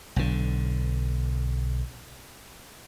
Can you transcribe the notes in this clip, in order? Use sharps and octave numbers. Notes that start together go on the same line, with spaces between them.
B1 D3